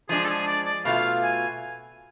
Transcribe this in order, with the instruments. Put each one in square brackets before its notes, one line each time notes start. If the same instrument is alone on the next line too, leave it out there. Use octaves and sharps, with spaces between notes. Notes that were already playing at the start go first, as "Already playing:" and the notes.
[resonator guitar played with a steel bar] F3 G#3 D4 [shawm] G#4
[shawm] A4
G#4
D5
D5
[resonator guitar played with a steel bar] B2 A3 F4 [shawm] F5
[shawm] G#5